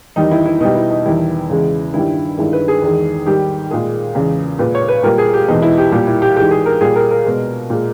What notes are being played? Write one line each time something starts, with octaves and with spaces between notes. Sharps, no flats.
E2 D#3 G3 D#4
E4
E4
B2 G3 D#4
E4
D#4
E2 D#3 G3 E4
E2 C#3 G#3
G2 D#3 G3 E4
G2 D#3 G#3 E4
B4
G#4
E2 D#3 G#3
G#2 D#3 G3 G4
A#2 G#3 G#4
E2 C#3 G#3
A#2 G#3 B4
C#5
B4
A#2 G3 A#4
G#4
G4
E2 B2 G#3 D#4
E4
G4
A#2 G3 G4
E4
G4
G#2 E3 G#3 G4
G#4
A#4
A#2 G3 G#4
A#4
A#4
B2 G#3
A#2 G#3